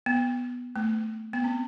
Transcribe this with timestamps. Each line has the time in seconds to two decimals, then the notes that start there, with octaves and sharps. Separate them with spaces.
0.06 B3
0.76 A3
1.33 B3
1.44 C4